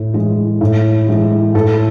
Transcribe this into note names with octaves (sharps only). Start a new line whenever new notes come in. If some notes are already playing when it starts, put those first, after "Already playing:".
Already playing: A2
E3 G#3
A2
E3 G#3
A2 A4